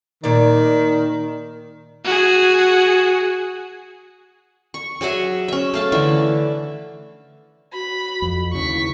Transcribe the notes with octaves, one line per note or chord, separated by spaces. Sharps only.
A#2 D#3 D5
F#4 G#4
C#6
F#3 G#4 E5 F#5
C#4 E5
A3 F5 A5
D3 E3 E5
F#4 B5
F2
D#2 C#3 E4 C#6 B6